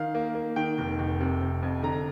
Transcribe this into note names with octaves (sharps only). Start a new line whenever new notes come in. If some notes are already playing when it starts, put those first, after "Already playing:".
Already playing: D#3 F5
A#3
A#3
D#3 G5
F1
F1
C3
C3
F2
D3 A#5